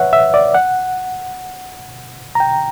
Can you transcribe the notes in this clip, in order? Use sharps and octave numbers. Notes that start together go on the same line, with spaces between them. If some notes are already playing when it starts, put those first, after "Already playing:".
Already playing: B4 C#5 E5 F#5
E5
D5
F#5
A#5
G5